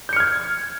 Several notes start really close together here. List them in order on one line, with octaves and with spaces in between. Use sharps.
G6 C#7 F6 G#6